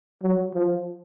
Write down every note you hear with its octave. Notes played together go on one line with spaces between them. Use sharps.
F#3
F3